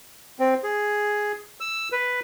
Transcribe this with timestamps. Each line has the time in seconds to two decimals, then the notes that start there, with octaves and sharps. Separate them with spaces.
0.39 C4
0.63 G#4
1.60 E6
1.92 B4